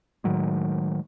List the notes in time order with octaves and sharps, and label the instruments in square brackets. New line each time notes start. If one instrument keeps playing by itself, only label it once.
[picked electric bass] A2 D#3 F#3 G#3